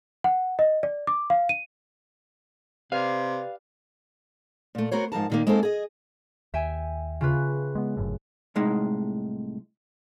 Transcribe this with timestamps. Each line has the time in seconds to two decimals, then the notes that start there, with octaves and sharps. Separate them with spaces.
0.24 F#5
0.59 D#5
0.83 D5
1.07 D6
1.30 F5
1.49 D#7
2.92 C3 G4 B4 D5 F5
4.75 A#2 A3
4.91 B3 F#4 A#4 C5 C#5
5.12 G#2 F3 A#4 A5
5.30 A#2 D#3 A#3
5.47 G#3 A#3 C4 D#4 A4 C5
5.63 G#4 D#5
6.54 D#2 E5 G5 G#5
7.21 C#3 F4 B4
7.75 G#3 B3
7.97 G1 F#2 A2
8.56 C2 A2 G#3 D#4